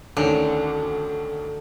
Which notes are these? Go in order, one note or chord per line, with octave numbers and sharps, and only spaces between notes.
D2 D3 D#3 C#4